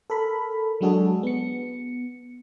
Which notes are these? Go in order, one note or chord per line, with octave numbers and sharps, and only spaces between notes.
A4 A#4 B5
F#3 G#3 D4 F#4 G#4 A4
B3 C#7